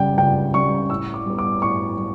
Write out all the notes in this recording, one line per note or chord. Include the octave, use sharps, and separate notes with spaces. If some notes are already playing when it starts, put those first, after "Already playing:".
Already playing: C#2 C#3 G3 G5
C#2 G5
C#3 G3 C#6
A2 E6
D6
G3 B3
D6
A2 C#6
G3